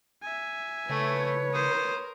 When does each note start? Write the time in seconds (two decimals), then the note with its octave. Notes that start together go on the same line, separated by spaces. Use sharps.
0.23 E5 G#5
0.89 C#3 A3 B4 C#5
1.53 A#4 C5 D#6